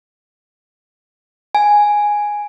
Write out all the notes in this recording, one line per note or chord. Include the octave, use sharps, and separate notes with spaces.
G#5